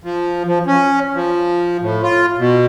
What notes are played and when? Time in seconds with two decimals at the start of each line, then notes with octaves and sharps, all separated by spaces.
0.03 F3
0.46 F3
0.67 C#4
1.14 F3
1.81 A2
2.03 F4
2.38 B2